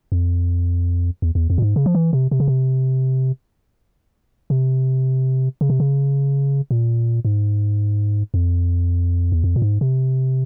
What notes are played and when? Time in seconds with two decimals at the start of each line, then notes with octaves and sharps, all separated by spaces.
0.12 F2
1.22 E2
1.35 E2
1.50 F2
1.58 A#2
1.62 G#2
1.76 C#3
1.86 F3
1.95 E3
2.13 C3
2.31 C3
2.40 C#3
2.48 C3
4.50 C3
5.61 C#3
5.70 C3
5.80 C#3
6.71 A#2
7.25 G#2
8.34 F2
9.32 E2
9.44 F2
9.56 A#2
9.62 G#2
9.81 C3